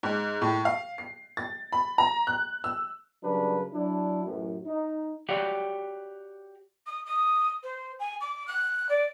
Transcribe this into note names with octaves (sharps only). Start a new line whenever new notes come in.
G#2
A2
F5
C7
A6
B5
A#5
F#6
E6
C#3 F#3 G3 D4 A#4 B4
F#3 D4 E4
A1 F#2
D#4
F#4 G4 C#5 D5 F5 F#5
D#6
D#6
C5
G#5
D6
F#6
D5